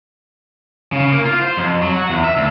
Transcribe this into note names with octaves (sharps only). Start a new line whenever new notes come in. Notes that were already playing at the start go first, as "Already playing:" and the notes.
C#3
A#3
F4
C5
F2
F#3
F#4
E2
E5
D2